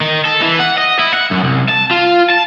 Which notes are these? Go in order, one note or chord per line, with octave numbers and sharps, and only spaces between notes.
D#3
A4
E3
F#5
D#5
E4
F#5
F#2
C2
A5
F4
A5